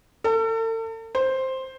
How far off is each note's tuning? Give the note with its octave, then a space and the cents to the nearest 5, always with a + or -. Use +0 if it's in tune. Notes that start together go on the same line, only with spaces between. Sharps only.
A4 +40
C5 +5